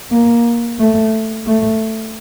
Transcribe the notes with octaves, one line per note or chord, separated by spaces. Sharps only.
A#3
A3
A3